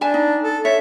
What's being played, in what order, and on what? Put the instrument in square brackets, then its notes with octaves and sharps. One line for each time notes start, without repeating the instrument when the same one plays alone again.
[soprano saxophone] D4 [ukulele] E5 G#5 A5
[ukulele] D#4
[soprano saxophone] A4
[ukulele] C#5 [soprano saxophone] E5